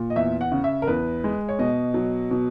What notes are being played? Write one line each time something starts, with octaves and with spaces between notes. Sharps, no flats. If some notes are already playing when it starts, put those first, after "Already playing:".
Already playing: A#2
D#5
E2 E5
F#5
C#3
E5
A#4
E2 B4
G#3
C#5
B2 D#5
F#3
B2